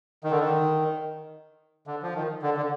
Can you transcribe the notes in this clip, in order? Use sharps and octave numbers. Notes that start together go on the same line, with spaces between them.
D#3
D3
D#3
D3
F3
D#3
D3
D3